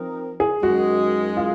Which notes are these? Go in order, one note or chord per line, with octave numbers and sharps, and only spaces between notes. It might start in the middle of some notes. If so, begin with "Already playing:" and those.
Already playing: F3 C4 D#4 A#4
G#4
F#2 D#3 G#3 F#4
F4